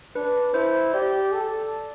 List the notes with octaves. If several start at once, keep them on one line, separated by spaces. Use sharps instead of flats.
D4 B4
E4 C5
G4 D5
A4